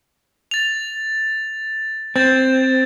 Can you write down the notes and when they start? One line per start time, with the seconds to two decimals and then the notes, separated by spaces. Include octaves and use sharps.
0.51 A6 F7
2.16 C4 G6 A6